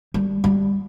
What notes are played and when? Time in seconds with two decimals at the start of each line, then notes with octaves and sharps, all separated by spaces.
0.14 G3
0.44 G3